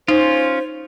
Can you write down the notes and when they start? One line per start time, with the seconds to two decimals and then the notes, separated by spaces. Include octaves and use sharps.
0.08 C#4 D#4 F4 C5